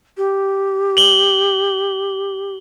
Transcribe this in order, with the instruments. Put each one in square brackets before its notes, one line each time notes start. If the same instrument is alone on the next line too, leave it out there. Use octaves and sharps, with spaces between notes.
[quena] G4
[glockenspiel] F#7 G7